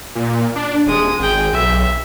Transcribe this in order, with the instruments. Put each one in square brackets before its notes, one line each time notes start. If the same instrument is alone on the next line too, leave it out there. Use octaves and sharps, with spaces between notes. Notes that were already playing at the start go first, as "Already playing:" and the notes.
[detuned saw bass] A#2
D4
[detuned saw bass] D#1 [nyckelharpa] G#3 D#6
[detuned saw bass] G#1 [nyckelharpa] G#4 G5
[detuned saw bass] B1 [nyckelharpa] E5